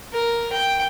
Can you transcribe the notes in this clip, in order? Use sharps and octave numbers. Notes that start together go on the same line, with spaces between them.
A#4
G5